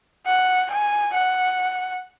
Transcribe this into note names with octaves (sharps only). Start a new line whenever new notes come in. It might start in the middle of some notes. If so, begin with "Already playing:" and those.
F#5
G#5
F#5